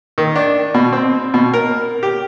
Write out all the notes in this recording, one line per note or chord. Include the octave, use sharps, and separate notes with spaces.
D#3
D4
B2
C4
B2
A#4
G4